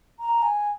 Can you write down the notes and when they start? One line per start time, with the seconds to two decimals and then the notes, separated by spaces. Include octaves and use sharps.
0.20 A#5
0.42 G#5